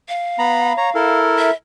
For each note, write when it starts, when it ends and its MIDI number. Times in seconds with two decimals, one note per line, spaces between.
0.09 1.19 77
0.39 0.73 59
0.39 0.73 82
0.39 0.73 83
0.77 0.90 73
0.77 0.90 82
0.95 1.50 64
0.95 1.50 69
0.95 1.50 70
1.38 1.53 76